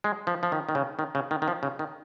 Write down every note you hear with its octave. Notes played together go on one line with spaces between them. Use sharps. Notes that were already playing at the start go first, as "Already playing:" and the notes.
G#3
F3
F3
D#3
D#3
C#3
D#3
C#3
D#3
D#3
F3
C#3
D#3